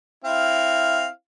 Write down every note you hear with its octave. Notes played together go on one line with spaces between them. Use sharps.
C4 E4 F5